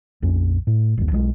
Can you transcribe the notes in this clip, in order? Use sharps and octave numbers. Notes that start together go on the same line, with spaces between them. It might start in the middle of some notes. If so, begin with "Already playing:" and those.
A#1 F2 C#4
A2
G1 D#2
B1 F3 G#3